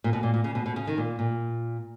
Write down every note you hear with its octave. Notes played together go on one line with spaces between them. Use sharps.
A#2
B2
A#2
A#2
C#3
B2
B2
C#3
D#3
A#2
A#2